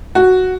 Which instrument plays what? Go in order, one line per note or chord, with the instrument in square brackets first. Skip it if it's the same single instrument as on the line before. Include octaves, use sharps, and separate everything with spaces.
[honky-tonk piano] F#4